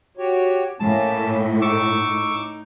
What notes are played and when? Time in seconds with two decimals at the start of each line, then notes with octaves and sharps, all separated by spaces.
0.17 F#4 G4 C#5
0.80 A2 A#3 C#4 A5
1.62 D#4 C#6 D6 E6